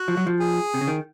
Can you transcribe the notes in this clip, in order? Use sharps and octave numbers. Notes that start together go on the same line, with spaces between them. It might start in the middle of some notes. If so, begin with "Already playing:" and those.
Already playing: F#4
F3
F#3
F3
G#4
C3
C#3
D#3